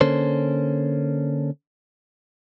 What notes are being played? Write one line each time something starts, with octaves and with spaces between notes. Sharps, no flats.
D3 A#3 C#4 A4 C5